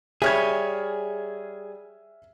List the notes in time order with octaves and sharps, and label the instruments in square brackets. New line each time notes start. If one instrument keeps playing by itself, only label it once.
[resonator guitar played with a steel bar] G3 C#5 [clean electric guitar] G#4 [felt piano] E5 F6 G#6